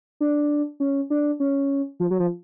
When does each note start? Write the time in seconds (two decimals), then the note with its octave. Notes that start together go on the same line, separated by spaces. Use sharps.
0.20 D4
0.80 C#4
1.10 D4
1.40 C#4
2.00 F3
2.11 F#3
2.20 F3